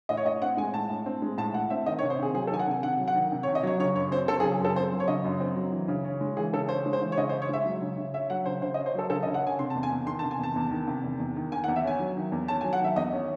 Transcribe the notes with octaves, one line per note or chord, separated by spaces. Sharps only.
A2 D#5
C#5
A2 D#5
C4 F#5
G#3 G#5
A2 A5
A2
C4
G#3
A2 A5
A2 F#5
C4 E5
D#3 D#5
C#5
C3
C5
C3 G#4
F#3 G#4
A4
D#3 G#5
F#5
C3 G#5
C3 F#5
F#3
F#5
D#3
C3
C#5
C3
D#5
F#3 C#5
C#3 C#5
F#2 C#5
C4 C5
F#3 A4
G#4
C#3
G#4
F#2 A4
C4 C5
F#3
C#5
C#3 D#5
F#2
C4
F#3
E3
C#3
C#4
G#3
E3 G#4
C#3 A4
C#4 C5
G#3
C5
E3
C#5
C#3 D#5
C5
C#4
C#5
G#3 E5
F#3
C#3
C#3
C#4 E5
F#3 F#5
C#3 C5
C#3 C5
D#5
C#4
C5
F#3 A4
C#3 A4
D#5
C#3
F#5
C#4 G#5
C3 C6
A5
E2
G#5
E2
D#3 C6
A5
C3
G#5
E2 A5
E2
D#3
C3
E2
E2
D#3
D#3 G#5
F#5
E2
E5
C#4 G#5
F#3
D#3
E2
C#4 A5
G#5
F#3
F#5
D#3 E5
E2 D#5
C#4